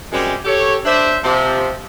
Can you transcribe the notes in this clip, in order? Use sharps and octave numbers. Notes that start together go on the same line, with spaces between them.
F#2 C3 G3 G#3
G4 A4 C#5
D4 C5 D5 E5
C3 F3